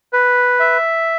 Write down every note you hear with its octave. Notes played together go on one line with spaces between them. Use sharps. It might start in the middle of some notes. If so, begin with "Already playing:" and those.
B4
E5